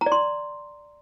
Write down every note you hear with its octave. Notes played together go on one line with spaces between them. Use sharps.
A#5
D5
C6